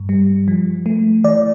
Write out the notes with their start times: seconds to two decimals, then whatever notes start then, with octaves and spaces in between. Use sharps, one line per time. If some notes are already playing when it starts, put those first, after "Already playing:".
Already playing: G2
0.09 G3
0.48 F3
0.86 A3
1.24 E3 D5